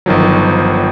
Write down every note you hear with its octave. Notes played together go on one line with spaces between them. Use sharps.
G1 D#3 F3 F#3